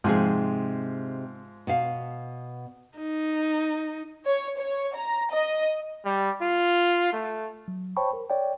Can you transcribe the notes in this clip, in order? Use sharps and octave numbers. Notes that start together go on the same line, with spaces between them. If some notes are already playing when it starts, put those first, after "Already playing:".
G#2 C3 F3 D#4 G#4
B2 F5
D#4
C#5
C#5
A#5
D#5
G3
F4
A3
F#3
C5 C#5 G5 A5 B5 C#6
A#4
C#5 D5 G5